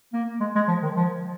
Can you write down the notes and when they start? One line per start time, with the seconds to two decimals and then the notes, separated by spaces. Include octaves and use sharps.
0.13 A#3
0.41 G#3
0.55 G#3
0.68 F3
0.83 D#3
0.96 F3